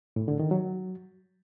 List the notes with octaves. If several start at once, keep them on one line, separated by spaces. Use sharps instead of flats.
A2
D3
D#3
F#3